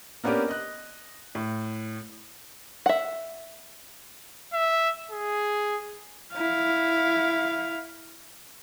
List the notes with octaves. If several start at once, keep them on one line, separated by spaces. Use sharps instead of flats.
A#3 B3 C#4 D4 G4 A#4
D#5 F#6
A2
E5 F#5
E5
G#4
E4 F5